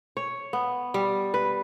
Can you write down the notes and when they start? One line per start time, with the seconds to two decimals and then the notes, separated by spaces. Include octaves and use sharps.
0.17 C#5
0.53 B3
0.94 G3
1.34 B4